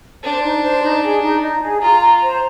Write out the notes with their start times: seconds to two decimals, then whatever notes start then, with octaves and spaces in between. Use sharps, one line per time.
0.23 D4 C5
0.44 D#4
0.63 C5
0.83 D#4
1.03 G#4
1.22 D#4
1.42 D#4
1.62 G#4
1.81 F4 A#5
2.01 A#5
2.22 C5